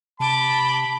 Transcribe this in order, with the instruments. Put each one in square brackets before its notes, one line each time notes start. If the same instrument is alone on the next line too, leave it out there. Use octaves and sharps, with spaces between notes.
[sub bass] C3 [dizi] A5 [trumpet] B5 [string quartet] D6 G6